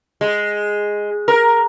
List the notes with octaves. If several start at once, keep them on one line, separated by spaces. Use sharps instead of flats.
G#3
A#4